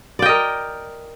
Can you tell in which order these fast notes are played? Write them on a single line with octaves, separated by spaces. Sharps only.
D5 G5 D#5 A#4